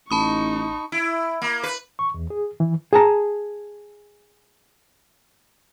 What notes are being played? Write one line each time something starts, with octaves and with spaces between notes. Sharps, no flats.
A1 D#4 A5 B5 C#6 D#6
E4
A#3
B4
C#6
E2
G#4
E3
G#4 A5 A#5